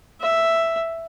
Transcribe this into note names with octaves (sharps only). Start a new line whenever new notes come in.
E5